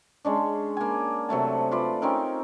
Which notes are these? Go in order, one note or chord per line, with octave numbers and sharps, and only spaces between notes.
G#3 C#4 D4
A#3 G#5
C3 F#3 A3 A5
F4 B4 D5
C4 C#4 D#4 A#4